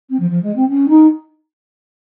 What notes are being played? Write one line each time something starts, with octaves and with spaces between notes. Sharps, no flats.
C4
F3
F3
G#3
C4
C#4
D#4